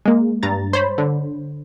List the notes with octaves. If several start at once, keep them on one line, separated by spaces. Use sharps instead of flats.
G#3 A#3
G2 A#5 A6
C5 C#5 B5
D3